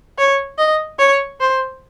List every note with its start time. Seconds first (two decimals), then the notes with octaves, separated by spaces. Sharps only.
0.18 C#5
0.58 D#5
0.99 C#5
1.40 C5